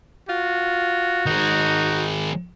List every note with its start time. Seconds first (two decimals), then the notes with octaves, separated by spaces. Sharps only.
0.29 F4 F#4
1.26 D#3 G#3 D#4